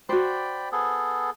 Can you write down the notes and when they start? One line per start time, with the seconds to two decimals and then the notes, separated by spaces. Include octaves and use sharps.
0.09 F#4 C5 D5 G5 B5
0.72 B3 G#4 A4